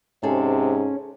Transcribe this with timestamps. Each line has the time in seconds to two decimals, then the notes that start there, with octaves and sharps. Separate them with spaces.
0.23 G#2 C3 C#4 G#4 A4